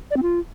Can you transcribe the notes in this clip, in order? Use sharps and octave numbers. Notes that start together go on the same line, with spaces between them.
D5
C4
F4